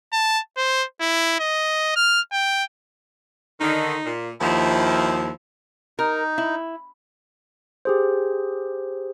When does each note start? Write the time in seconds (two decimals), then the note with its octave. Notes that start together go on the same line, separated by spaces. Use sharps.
0.13 A5
0.57 C5
1.01 E4
1.40 D#5
1.96 F6
2.32 G5
3.60 D3 D#3 D#4
4.05 A#2
4.41 D#2 F3 E4
5.99 D#4 A#4
6.38 E4
7.85 G4 G#4 C5